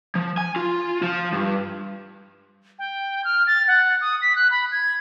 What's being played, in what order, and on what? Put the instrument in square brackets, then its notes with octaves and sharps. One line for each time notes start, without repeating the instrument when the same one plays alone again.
[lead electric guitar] F3
G#5
F4
F3
G2
[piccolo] G5
F6
A6
F#5
D#6
B6
F#6
B5
G#6